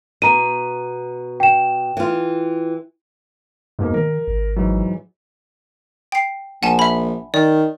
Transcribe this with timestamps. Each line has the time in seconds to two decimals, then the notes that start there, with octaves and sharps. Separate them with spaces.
0.22 B2 A#5 D#7
1.40 G5 E7
1.97 E3 F4
3.79 F2 G#2 B2 A#3
3.94 D#3 A#4
4.28 G#1
4.56 G#2 E3 F#3
6.12 G5 C7
6.63 A#1 F#5 G#5 A5
6.79 E5 B5
7.34 D#3 D5